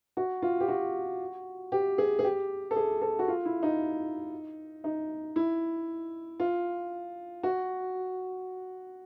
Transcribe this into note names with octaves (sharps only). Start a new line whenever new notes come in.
F#4
F4
G4
F#4
G4
G#4
G#4
G4
A4
G#4
A4
F#4
F4
E4
D#4
D#4
E4
F4
F#4